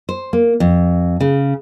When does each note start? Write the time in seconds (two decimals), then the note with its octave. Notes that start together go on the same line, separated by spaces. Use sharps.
0.09 C5
0.33 A#3
0.60 F2
1.20 C#3